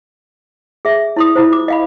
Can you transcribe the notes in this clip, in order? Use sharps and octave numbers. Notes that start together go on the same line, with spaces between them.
G#4 E5
E4 C6 D#6
E4 F4 C5
D6
D#5 F5 B5